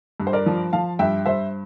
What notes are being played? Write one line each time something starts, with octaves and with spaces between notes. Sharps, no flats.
G2
C5
A#4 D5
F3
F3 F5 A5
G2 E5 G5
G2 C5 E5